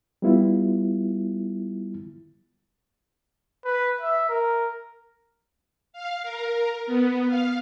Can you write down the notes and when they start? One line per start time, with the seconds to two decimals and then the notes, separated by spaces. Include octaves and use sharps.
0.22 G3 B3 E4 F4
3.65 B4
4.01 E5
4.29 A#4
5.93 F5
6.23 A#4
6.86 B3
7.28 F5